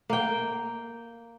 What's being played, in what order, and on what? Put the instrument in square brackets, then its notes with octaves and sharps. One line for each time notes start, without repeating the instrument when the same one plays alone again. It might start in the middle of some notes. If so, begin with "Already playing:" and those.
[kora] A#3 G5